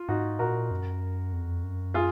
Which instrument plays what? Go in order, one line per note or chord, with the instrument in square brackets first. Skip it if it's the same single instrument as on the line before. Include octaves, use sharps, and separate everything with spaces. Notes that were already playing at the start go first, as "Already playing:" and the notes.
Already playing: [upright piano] F4
[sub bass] G#2 [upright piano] D#4 F#4
[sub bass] A#2 [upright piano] F#4 A#4
[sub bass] F#2
F2
F#2
[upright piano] F4 G#4